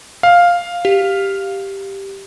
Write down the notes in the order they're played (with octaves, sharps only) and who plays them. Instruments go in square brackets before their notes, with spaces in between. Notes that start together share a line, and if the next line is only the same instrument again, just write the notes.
[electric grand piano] F5
[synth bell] G4